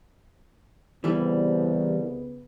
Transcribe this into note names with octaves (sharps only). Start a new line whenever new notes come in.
C2 C#3 E3 G3 B3